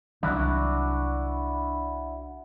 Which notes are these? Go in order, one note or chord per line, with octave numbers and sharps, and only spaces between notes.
C2 D#3 F#3 D4 E4 F#4